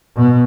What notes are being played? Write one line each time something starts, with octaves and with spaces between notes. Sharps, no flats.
B2